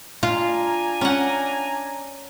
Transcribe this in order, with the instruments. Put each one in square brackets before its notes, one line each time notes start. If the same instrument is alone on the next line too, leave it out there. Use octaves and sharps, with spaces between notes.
[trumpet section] D4 G#5 A#5 [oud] F4
[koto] C#4 F#5